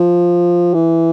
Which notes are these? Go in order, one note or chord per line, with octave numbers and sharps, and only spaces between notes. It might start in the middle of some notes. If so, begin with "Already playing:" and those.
Already playing: F3
E3